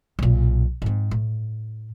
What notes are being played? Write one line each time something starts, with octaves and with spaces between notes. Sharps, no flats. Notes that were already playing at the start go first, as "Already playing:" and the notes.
B1 A#2
G#2 C4
A2